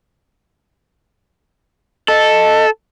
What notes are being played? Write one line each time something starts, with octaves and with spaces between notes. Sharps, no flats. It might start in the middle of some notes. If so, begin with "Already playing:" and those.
A4 D#5